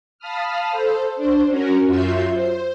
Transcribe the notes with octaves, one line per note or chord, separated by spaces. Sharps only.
F5 A5 B5 D#6 F6
A4 C5
D4 C5
C#4 F#4 A#4
F#2 F4 F#4 E5 C6 G6
C5